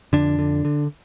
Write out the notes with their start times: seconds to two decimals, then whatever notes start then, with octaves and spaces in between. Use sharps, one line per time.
0.13 F2 D3 D4
0.39 D3
0.65 D3